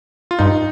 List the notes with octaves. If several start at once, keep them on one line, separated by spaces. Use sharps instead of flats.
F4
G2 D#4